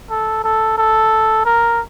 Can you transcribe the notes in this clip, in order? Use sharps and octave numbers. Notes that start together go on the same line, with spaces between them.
A4
A4
A4
A#4